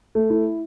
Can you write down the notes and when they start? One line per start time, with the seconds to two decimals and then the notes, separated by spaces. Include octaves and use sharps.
0.15 A3
0.30 E4